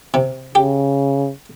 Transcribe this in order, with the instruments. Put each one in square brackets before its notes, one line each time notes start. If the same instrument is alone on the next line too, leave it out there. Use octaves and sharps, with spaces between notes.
[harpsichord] C3
[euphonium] C#3 [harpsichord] G4